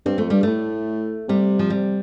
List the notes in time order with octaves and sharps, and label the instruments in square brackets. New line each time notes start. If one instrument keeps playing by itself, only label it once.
[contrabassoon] G2 [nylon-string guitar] C4
[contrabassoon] F2 [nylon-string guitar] A3
[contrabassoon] G2 [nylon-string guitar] G3
[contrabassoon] A2 [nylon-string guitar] A3
[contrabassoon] C3 [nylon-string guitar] G3
[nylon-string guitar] F3
G3